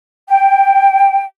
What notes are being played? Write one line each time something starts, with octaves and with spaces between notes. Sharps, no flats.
G5